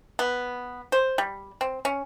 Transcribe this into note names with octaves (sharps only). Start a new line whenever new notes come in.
B3
C5
G3
C4
C#4